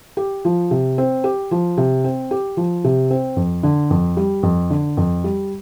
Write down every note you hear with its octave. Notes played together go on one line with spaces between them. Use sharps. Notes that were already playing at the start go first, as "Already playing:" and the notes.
G4
F3
C3
C4
G4
F3
C3
C4
G4
F3
C3
C4
F2
D3
F2
G3
F2
D3
F2
G3